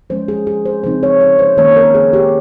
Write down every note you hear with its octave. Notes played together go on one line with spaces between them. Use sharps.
F3 G#3 C#4 C5
G#4
G#4
C5
C#3 F3 C4 D#4 C5
C#5
C#5
C5
D#3 A#3 C#4 C#5
A#4
G#4
G4